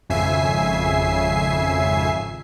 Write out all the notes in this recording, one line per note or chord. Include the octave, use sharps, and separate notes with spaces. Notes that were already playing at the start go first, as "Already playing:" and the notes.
G#1 F2 C#3 E5 G#5 C7